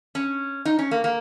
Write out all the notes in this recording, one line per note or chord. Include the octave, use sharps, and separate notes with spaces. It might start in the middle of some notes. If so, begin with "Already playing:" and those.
C#4
D#4
C#4
A#3
A#3